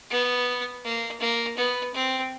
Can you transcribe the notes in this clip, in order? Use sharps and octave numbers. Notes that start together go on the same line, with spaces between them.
B3
A#3
A#3
B3
C4